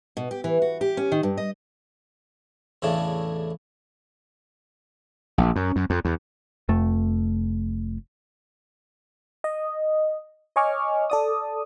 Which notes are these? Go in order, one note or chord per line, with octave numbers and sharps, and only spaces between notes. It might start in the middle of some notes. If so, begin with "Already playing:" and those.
B2
G4
E3
F#4
G4
C#4
D#3
G2
D#5
E2 A2 C#3 A3 D4
A#1
F#2
F#2
F2
E2
F1 F2 A3
D#5
C#5 D#5 G#5 C#6 D6 F6
A4 D5 D#6